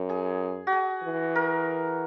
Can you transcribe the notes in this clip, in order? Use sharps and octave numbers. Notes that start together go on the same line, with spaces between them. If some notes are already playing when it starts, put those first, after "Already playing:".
Already playing: F#2
G#4
F#4
G#4
E3
A#4